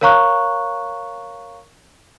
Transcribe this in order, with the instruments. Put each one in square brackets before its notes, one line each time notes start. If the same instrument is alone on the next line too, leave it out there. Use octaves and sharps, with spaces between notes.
[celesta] A#4 C#5 F5 A#5 C#6 F#6